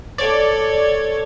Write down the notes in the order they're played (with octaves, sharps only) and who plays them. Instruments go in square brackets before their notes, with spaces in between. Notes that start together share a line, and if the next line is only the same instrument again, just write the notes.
[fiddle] A4 C#5 [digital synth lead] D5